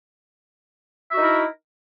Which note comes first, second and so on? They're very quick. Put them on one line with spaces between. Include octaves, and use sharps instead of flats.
E5 F#4 D#4 E4 A#4